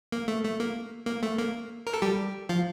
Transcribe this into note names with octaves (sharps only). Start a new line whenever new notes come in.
A#3
A3
A3
A#3
A#3
A3
A#3
A#4
A4
G3 G4
F3 F4